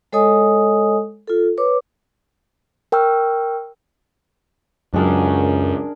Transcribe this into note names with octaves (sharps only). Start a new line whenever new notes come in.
G#3 A4 C#5 D#5 G#5 D#6
F4 A4
B4 C#5 D6
A#4 G5 C#6 E6 F6
C#2 F#2 F#3 D4 G#4 A#4